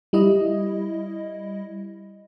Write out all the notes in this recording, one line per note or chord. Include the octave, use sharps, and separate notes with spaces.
G3 E4 D#5